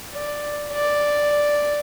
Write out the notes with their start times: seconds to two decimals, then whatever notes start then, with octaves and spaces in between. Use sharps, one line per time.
0.14 D5
0.73 D5